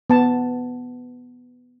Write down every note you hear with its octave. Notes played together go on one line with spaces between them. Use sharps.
B3 A5